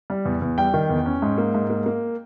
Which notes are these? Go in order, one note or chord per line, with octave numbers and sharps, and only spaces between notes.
G3
E2
E2
G3 G5
D#3
E2
C#4
G#2
A#3
G#2
A#3
A#3